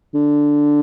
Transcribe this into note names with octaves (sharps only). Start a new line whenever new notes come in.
D3